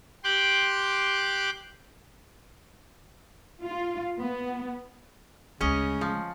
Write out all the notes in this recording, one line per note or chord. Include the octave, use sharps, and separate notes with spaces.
G4 G5 C6 D6 F#6
F4
B3
D2 C#3 G#3 C#4 D#5
F3